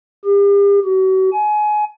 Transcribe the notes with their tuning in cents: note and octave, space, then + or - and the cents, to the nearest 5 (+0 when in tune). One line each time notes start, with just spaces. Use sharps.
G4 +40
F#4 +40
G#5 +25